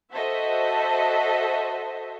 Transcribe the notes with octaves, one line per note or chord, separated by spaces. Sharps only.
F#4 A4 C5 D#5 E5